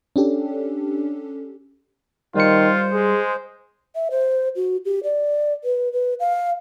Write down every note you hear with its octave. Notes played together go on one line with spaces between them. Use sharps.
C#4 D4 G4 A4
D#3 G3 F4 C5 C#7
G#3 G#4
E5
C5
F#4
G4
D5
B4
B4
F5